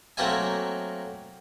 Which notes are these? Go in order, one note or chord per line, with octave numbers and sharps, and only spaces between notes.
F#3 A3 A#3 C4 E5 G#5